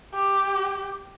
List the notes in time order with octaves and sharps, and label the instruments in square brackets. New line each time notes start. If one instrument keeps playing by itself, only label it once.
[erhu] G4